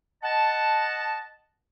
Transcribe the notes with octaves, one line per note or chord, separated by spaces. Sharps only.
D#5 F#5 A5